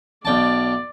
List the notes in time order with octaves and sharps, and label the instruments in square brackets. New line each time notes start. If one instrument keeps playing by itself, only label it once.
[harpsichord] B1 G5 A5 [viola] D5